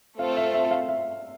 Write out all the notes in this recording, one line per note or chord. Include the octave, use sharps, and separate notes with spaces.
A3 C4 F4 A4 C5 F5
E5
E5
F5
E5